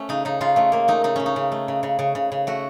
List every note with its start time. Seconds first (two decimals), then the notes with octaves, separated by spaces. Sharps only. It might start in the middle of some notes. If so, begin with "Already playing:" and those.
Already playing: A3 C#4
0.09 C#3 D#4
0.25 C#3 D#4
0.41 C#3 F4
0.56 C#3 A3
0.72 C#3 A#3
0.88 A3 D#4
1.04 C#3 D#4
1.16 C#3 C#4
1.26 D#4
1.36 C#3
1.52 A3
1.68 C#3
1.83 C#3
1.99 C#3
2.15 C#3
2.32 C#3
2.47 A3 F#4